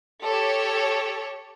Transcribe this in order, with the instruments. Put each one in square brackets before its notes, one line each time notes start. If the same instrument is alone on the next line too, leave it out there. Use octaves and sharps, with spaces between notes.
[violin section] G4 A4 C#5